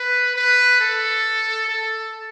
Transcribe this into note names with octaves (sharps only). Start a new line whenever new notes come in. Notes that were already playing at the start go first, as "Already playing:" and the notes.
Already playing: B4
B4
A4
A4